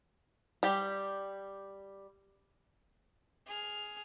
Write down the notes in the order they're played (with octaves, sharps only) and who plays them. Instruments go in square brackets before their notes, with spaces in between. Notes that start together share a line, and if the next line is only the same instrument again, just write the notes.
[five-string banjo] G3 G4
[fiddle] G#4 F6